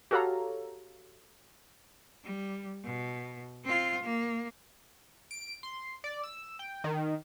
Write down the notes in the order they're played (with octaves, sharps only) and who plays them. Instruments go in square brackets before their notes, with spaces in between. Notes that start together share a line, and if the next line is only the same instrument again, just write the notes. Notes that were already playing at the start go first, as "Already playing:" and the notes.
[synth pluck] F#4 G4 A4 C#5 F5 A#5
[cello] G3
B2
C4 F4
A#3
[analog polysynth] D7
C6
D5
E6
G5
D#3